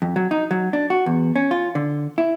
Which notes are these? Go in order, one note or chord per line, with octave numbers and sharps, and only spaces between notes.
F2
F#3
D#4
F#3
D4
F#4
E2
C#4
F4
D3
E4